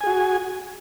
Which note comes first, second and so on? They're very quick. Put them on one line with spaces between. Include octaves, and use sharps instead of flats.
G#5 G#4 F#4